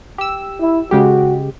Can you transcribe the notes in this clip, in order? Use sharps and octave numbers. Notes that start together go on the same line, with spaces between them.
G4 E6
E4
C#3 G#3 F#4 G4